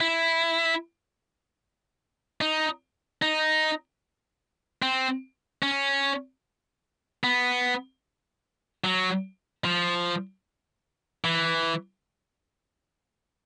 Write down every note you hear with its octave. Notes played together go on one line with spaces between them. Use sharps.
E4
D#4
D#4
C4
C#4
B3
F#3
F3
E3